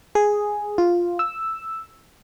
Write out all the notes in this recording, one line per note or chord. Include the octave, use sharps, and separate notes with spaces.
G#4
F4
E6